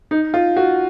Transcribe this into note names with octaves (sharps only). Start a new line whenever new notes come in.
D#4
F4
F#4